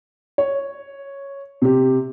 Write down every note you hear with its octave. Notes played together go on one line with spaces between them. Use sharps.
C#5
C3 G4